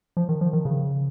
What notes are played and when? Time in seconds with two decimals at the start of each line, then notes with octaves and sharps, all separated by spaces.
0.17 F3
0.29 D#3
0.41 F3
0.53 D#3
0.65 C#3